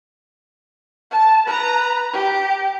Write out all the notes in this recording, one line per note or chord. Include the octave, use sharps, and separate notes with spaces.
A5
B4 A#5
G4